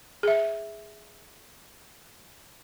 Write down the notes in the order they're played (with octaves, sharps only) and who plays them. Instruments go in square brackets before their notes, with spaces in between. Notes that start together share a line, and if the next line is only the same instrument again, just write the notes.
[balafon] G#4 E5